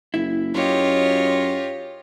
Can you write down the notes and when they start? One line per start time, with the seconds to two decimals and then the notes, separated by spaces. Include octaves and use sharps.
0.14 F#1 E4
0.54 F#2 F4 G4 C#5 D#5